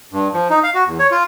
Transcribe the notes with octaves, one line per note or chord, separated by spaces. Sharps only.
G2
F3
D#4
F5
F#4
E2
C#5
F4